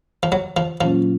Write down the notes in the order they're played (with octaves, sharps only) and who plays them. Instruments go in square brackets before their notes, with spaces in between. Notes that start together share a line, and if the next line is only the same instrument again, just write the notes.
[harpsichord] F3
F#3
F3
[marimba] A#2 F#3 A#3 C#4 F4 [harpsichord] F3